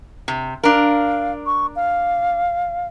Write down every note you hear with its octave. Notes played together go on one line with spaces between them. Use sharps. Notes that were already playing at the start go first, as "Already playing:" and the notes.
C3
D4 A#4 F5
C#6
F5